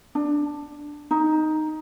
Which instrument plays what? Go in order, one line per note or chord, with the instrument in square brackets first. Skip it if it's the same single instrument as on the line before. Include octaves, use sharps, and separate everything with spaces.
[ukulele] D4
D#4